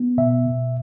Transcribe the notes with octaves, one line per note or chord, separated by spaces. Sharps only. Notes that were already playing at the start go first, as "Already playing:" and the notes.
Already playing: B3
B2 E5
B2